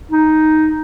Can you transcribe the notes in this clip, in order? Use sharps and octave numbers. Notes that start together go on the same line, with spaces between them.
D#4